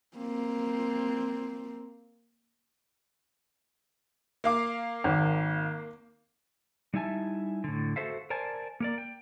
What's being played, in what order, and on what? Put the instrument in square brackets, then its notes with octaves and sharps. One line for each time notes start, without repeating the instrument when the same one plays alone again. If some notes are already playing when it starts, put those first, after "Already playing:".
[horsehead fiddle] A#3 C4
[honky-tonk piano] A#3 F5 D6
[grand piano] G#1
[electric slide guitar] G3 D#4 E4 E5 G#5 A5
A2 D3
F#4 G4 A4 C5 E5 F5
A#4 C5 D5 G#5 A5
A#3 A#4 D5
G5